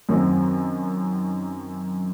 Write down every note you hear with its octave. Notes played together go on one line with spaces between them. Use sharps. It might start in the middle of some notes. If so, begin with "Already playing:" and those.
F#2 D#3 F#3 C4